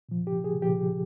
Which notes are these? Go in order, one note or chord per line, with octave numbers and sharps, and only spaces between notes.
A#2 F3
G4
G#4
A#2 F3 G4